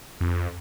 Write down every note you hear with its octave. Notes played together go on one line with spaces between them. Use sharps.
F2